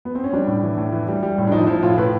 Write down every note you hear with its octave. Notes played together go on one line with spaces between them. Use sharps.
B3
C4
C#4
G3 D4
A2
E3
A2
E3
G3
G3
A2
D4
F3 D#4
F3 E4
A2 F4
A2 B4